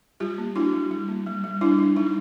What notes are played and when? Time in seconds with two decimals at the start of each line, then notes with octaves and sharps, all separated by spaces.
0.20 G3 F4 G4
0.38 A#3
0.56 D4 E4 F#4
0.73 G3
0.91 G3
1.09 A#3
1.26 G3
1.44 G3
1.61 G3 D4 E4
1.79 D4
1.96 G3 D#4